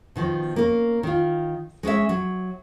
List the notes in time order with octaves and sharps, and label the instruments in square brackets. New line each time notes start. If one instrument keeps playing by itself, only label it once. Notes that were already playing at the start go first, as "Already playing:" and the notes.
[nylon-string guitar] B2 D#3 F3
A#3 C#4 A#4
D#3 F4
G#3 C#4 C#5 E5
F#3